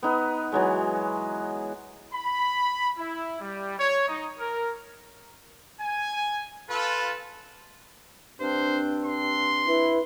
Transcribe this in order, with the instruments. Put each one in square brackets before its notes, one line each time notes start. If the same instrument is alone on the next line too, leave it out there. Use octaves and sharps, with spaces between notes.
[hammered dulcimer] B3 D#4 B4
E3 F#3 G#3
[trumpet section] B5
E4
G3
C#5
D#4
A#4
[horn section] G#5
F4 A4 B4
[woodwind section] G2 C4 D4 [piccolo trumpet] C5
[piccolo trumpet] C6
[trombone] E4 [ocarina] B4